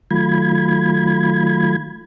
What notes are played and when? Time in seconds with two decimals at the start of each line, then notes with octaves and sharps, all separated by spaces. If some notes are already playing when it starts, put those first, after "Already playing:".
0.11 D#3 F#3 A3 F4 B5 G#6